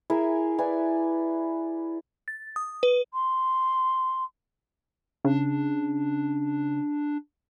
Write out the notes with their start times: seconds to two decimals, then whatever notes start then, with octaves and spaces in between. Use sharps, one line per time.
0.10 E4 G#4 A#4 E5
0.58 E4 B4 D5 G#5
2.28 A6
2.56 D#6
2.83 B4
3.12 C6
5.25 C#3 D4